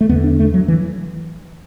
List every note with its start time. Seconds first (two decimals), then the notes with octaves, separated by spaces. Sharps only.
0.01 A3
0.09 E2 D3 B3
0.24 D4
0.39 A3
0.54 F#3
0.68 E3